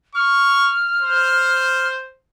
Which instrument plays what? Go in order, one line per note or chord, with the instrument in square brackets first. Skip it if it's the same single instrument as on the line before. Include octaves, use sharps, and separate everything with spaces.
[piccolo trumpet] C#6 [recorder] F6
[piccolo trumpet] C5